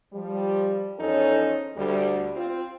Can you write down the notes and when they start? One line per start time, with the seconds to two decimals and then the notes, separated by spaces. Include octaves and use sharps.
0.13 F3 G3
0.99 E2 F3 C#4 D#4 A4 C#5
1.76 D2 G3
2.36 C4 F4